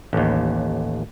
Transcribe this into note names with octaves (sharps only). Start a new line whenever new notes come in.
A1 D#2